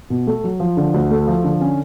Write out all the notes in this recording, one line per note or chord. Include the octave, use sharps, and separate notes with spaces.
B2
A3
F#3
F3
D3
D2
A3
F3
D3
C#4